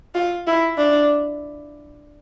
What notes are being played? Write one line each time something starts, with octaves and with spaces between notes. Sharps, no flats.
F4
E4
D4